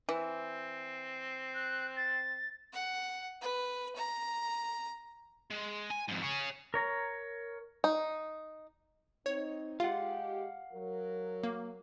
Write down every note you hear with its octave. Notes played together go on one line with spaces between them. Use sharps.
E3 C4
F#6
A6
F#5
B4
A#5
G#3
G#5
F2 G#2
G#4 C#5
A#4 C#5 A#5
D#4
C4 D#4 C#5
G#3 F4 G4 F5 F#5
F#3 A#4
A#3